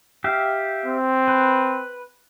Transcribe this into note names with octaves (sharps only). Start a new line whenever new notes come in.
G4 E5 F5
C4
B4